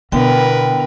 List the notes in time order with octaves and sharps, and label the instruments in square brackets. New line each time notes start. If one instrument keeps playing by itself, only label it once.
[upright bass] B2 [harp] D3 B3 E4 [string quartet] A#4 B4 [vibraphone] G5